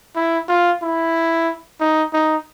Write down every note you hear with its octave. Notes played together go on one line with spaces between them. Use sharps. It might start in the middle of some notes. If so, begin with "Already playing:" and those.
E4
F4
E4
D#4
D#4